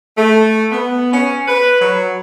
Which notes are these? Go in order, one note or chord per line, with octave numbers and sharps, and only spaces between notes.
A3
B3
C#4
B4
F#3